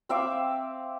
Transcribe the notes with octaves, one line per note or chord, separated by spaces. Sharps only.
C4 E5 F5 D6